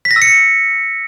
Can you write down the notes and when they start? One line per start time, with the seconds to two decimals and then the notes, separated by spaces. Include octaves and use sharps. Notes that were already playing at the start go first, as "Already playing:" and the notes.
0.05 B6
0.11 A#6
0.16 E6
0.22 C#7